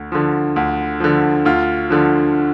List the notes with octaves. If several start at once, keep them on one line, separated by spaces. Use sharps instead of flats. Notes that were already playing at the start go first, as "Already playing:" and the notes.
Already playing: D2
D3 F3
D2
D3 F3
D2 F4
D3 F3